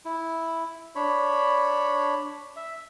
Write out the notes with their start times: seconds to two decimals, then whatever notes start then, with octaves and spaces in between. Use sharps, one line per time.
0.05 E4
0.95 D4 C#5 B5
2.56 E5